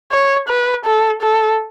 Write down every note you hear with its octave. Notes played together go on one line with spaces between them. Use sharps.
C#5
B4
A4
A4